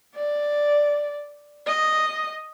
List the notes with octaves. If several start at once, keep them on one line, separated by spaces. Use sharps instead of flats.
D5
D#5